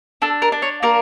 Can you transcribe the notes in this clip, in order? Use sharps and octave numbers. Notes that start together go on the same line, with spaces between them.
D4 A4
A#4
D4
C#5
A#3 A#4